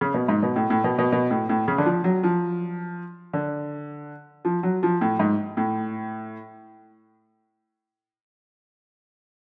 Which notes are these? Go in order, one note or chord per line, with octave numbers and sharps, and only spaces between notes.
C#3
B2
G#2
B2
A2
A2
B2
B2
B2
A2
A2
C#3
D3
F3
F#3
F3
D3
F3
F#3
F3
A2
G#2
A2